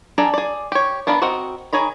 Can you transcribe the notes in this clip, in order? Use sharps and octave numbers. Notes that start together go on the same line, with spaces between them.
D4 G#4 A4 A#5
G#4 D5
G4 C#5
B3 D4 A#4 F5 B5
C4 F#4 A#4 D#5 F#5
D#3 G#4 C#5 A#5 B5